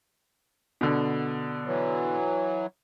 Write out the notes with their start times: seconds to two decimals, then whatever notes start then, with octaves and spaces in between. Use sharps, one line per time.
0.81 B2 D3
1.66 E3 F#3